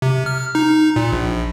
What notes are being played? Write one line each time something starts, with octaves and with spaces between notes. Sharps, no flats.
C3
F6
D#4
A#2
A#1